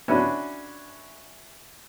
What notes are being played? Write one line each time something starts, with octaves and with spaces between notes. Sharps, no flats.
C#4 D4 E4 F#4 B4